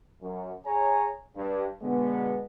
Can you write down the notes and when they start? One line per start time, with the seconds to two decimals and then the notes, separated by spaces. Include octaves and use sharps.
0.22 F#2
0.66 G#4 C#5 G#5 A#5
1.36 G2
1.82 B2 D3 G#3 B3